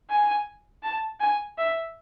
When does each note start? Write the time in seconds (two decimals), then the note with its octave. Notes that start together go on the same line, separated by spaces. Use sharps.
0.10 G#5
0.83 A5
1.20 G#5
1.58 E5